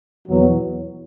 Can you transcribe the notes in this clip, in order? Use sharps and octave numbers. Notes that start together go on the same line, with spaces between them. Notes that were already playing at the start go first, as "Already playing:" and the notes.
E2 B2 F#3